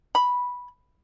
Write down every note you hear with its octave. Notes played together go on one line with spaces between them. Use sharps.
B5